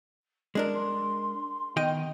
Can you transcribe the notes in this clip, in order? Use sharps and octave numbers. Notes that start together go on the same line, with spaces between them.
G#3 D4 F#4 A#4
C6
D#3 B3 D#5 G5